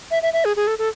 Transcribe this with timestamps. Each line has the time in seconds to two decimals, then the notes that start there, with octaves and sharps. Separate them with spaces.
0.11 E5
0.23 E5
0.33 E5
0.45 G#4
0.56 G#4
0.67 A4
0.79 A4